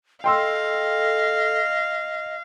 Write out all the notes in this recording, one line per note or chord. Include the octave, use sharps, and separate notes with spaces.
A4 D#5 F5 G5 C6 E6